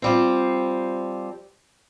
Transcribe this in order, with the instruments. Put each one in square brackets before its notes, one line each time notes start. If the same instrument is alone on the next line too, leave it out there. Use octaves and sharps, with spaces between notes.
[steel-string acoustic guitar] F3 G3 C4